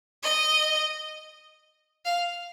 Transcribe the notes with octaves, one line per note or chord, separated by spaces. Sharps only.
D#5
F5